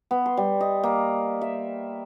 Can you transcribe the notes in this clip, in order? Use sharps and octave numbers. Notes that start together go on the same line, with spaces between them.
B3
C6
G3
D#5
A#3
E5